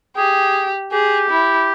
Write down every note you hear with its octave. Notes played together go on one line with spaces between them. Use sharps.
G4 G#4
G4 G#4
E4